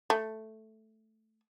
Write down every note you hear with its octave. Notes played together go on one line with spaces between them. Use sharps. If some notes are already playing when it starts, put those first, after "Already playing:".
A3